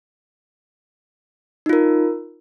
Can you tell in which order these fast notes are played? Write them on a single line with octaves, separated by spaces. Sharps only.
D#4 F4 A#4